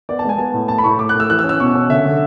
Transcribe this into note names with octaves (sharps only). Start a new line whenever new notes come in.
B3 D5
A5
G#3 G#5
B3 A5
A2
A2 A5
B5
A2 C#6
A2 D6
F#6
A2
E6
E3 F#6
E6
C#4
E6
B2 C#6
C#4
D3 E5
D3